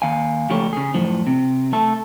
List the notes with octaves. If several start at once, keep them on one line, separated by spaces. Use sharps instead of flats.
D#2 F5 G#5
C#2 C#3 F3 A3 G4 C#5
C#3 G#4
F#2 A2 F3
C3
A3 A4